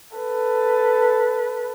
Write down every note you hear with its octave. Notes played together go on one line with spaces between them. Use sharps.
A4 B4